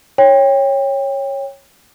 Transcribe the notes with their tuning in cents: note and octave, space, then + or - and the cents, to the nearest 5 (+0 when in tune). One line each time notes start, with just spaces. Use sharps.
C#5 -10 G5 +20